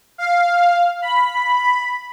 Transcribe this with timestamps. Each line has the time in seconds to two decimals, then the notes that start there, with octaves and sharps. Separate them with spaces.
0.18 F5
1.02 B5